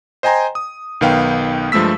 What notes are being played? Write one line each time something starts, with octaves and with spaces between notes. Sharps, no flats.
C5 D#5 G5 G#5 A#5 C6
D#6
B1 D#3 B3 F5 G5
G2 F3 G#3 A3 E6 B6